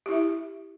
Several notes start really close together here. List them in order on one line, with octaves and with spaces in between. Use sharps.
G4 E4 E5